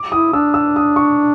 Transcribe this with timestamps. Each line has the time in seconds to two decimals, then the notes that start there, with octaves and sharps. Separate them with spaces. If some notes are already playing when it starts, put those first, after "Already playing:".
Already playing: D6
0.12 E4 D#6
0.33 D4 E6
0.54 E6
0.76 D#6
0.96 C#6